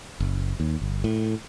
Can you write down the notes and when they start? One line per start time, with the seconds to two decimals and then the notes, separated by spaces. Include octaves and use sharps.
0.20 F#1
0.60 D#2
0.82 G1
1.04 A2